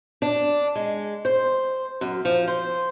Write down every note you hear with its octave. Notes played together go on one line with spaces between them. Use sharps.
D4
G#3
C5
F#2
F3
C5